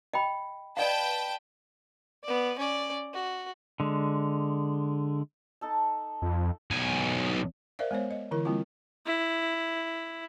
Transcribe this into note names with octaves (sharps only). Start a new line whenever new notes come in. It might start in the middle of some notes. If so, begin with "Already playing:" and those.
D#5 G5 B5
B4 D5 D#5 F5 G5 A5
B3 D5
C#4 D5
F#4
D3 G#3
D#4 A4 A5
F2
B1 G#5
A#4 C5 D5 E5 F5
G#3 B3 C5 C#5
D#5
D3 E3 E4 A#4
G3 A#3 C4 E4 F4
E4